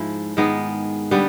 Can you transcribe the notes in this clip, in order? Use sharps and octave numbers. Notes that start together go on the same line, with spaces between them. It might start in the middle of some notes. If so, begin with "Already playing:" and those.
Already playing: G#2 F3 G#3 E4
G#2 D#3 G#3 B3
D3 G3 B3